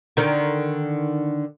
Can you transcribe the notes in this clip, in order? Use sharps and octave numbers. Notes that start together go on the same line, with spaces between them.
D3 D#3